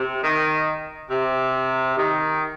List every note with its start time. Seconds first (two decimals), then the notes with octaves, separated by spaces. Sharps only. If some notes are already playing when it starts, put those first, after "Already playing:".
Already playing: C3
0.23 D#3
1.10 C3
1.96 D#3